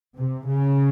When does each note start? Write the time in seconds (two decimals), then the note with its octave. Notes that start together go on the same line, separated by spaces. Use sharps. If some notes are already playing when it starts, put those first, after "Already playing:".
0.17 C3
0.48 C#3